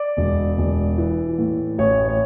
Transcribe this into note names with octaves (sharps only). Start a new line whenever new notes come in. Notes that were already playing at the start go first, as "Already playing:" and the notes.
Already playing: D5
E1
E1
E3
A2
A1 C#5
C#5